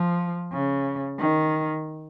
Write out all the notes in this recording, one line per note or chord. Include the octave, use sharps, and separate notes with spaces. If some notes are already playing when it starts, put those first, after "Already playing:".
Already playing: F3
C#3
D#3